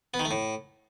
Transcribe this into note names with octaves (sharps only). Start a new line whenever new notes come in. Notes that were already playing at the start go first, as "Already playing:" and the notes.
B3
D#3
A3
A2